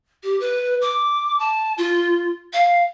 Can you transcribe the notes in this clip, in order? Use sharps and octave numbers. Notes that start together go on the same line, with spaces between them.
G4
B4
D6
A5
F4
F5